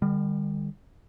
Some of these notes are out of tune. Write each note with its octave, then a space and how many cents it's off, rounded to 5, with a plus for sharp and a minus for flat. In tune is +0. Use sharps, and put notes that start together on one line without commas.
D#3 -40 G3 +30